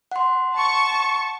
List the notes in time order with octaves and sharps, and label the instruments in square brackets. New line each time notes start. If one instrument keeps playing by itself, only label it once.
[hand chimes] F#5 C6
[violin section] A5 C#6